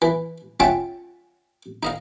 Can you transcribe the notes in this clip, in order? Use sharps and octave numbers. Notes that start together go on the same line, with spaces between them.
E3
C#4 F4 E5 F#5 G5 A5
D#4 D#5 F5